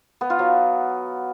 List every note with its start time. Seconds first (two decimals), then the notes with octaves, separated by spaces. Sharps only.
0.21 B3
0.30 F4
0.39 F#3